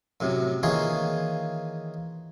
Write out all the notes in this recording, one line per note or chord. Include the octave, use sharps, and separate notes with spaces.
F#2 A2 C3
D#3 E3 A#3 F4 G#4 C#5